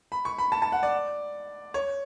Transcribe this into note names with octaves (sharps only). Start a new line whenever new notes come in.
B5
C#6
B5
A5
A5
F#5
D5
C#5